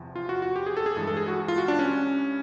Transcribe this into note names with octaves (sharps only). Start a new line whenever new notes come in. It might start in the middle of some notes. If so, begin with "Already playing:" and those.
Already playing: E2 C3 F3
F4
F#4
F#4
G4
G#4
A4
G#4
G2 E3 G#3 A4
A4
G#4
F#4
F4
F#4
D4
C#4